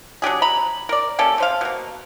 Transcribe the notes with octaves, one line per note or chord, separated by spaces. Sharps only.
F#3 D4 G4 G#4
A#5 B5
A#4 D5
A#3 C#4 G4 A4
A3 C5 F5
B2 A#3